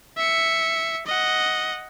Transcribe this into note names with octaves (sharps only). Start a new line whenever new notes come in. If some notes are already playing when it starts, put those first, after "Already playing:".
E5 C#7
D#5 F#5